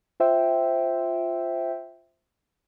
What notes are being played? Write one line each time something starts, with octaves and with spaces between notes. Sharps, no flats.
F4 C5 E5 G5